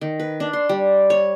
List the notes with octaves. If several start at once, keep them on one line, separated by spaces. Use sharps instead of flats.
D#3
B4
D4
C6
G3
C#5